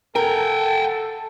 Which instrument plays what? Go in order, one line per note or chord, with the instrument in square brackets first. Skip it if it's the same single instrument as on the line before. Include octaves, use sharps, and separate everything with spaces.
[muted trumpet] A4 [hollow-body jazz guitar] A#4 [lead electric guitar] F#5 G5